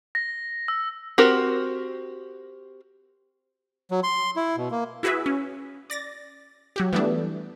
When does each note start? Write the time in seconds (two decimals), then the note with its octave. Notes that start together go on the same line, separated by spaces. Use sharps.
0.15 A#6
0.68 E6
1.18 C4 F#4 G4 A#4
3.91 F#3
4.03 C6
4.36 E4
4.57 B2
4.71 A#3
5.03 E4 F#4 G#4 B4 E5
5.26 C#4
5.90 D5 A6 A#6
6.76 F#3 F#4 G4
6.93 E3 G3 A3 B3 D4